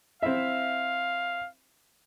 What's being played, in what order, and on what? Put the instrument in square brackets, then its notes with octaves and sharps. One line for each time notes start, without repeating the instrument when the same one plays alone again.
[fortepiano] C4 E4 E5 [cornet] F5